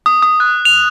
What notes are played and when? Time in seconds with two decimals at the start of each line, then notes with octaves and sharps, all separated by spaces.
0.06 D#6
0.22 D#6
0.40 F#6
0.65 F7